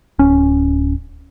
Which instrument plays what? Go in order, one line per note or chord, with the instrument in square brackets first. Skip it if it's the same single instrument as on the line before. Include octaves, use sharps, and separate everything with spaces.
[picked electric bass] D1 C#4